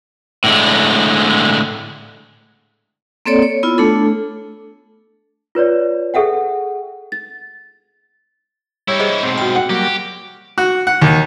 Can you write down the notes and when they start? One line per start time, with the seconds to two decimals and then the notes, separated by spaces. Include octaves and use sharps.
0.44 A2 D3 G#3
3.26 A#3 C4 A4 C#5 D5
3.42 C#5
3.63 B3 E4 F4
3.78 A3 D4 A4
5.55 F4 B4 C#5 D5
6.14 G#4 A4 E5 F#5 G5
7.12 A6
8.88 G3 D#4 E4 C#5 E6
9.00 G#4 C5 D#5
9.23 G#2 B2 C4
9.38 F#4 G5
9.55 F#5
9.70 F#3 G3 A#3 G4
10.58 F#4
10.87 F#5
11.02 D#2